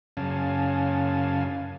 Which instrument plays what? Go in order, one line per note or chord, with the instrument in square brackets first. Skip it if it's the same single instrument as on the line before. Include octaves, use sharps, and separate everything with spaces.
[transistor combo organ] F#2 C#3 C#4 F5 G#5 A5